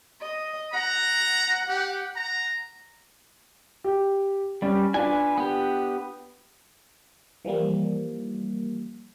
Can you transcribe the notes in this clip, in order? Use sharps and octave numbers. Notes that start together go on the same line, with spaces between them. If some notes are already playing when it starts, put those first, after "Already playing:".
D#5
F#5 A#5
G4
A#5
G4
G3 C#4 D5
D4 F4 B4 G#5
B3 G4
E3 F3 G3 A#3